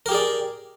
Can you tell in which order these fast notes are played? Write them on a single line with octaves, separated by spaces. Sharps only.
A#4 G4 G#4 D5